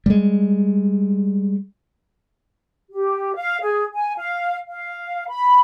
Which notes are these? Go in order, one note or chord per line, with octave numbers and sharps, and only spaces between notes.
G3 G#3
G4
F5
G#4
G#5
F5
F5
B5